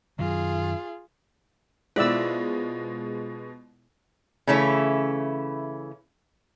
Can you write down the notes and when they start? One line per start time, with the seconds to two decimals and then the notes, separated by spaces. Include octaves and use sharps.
0.19 F#2 D#3 F#3 F4 G#4
1.96 B2 G#3 E4 F4 C5 D5 E6
4.47 C#3 E3 A3 C#4 E4